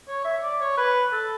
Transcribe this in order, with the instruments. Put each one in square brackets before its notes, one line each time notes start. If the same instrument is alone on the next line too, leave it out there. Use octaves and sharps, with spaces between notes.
[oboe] C#5
E5
D5
C#5
B4
A4